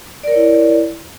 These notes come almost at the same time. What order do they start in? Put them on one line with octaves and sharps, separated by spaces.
D5 A#4 C#5 E4